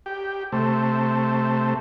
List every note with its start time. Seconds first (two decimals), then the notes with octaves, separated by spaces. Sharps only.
0.06 G4
0.52 C3 A3